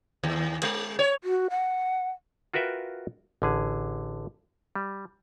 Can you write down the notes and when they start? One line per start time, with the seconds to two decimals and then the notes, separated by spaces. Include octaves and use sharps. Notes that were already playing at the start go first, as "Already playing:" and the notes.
0.23 D#2
0.63 G#3
0.99 C#5
1.24 F#4
1.50 F#5
2.54 F4 F#4 A#4 B4 E5 G5
3.42 A1 D3 G#4
4.75 G3